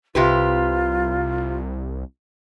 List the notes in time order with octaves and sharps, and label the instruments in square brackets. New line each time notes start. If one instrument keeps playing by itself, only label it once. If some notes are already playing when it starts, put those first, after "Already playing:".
[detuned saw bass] C2 [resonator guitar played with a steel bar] C3 G4 B4 [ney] F4